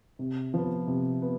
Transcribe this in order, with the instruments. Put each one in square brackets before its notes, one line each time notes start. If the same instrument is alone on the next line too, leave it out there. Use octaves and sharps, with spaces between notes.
[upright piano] C3
F3 B3
C3
B3